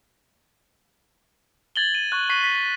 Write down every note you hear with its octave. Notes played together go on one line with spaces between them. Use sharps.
G#6 A6 F#7 G7
D#7
C#6 F#6
C#6 F#6 B6 C7 D#7
B6